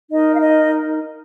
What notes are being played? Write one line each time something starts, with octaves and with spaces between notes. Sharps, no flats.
D#4 A#4 D#5
F5
D#5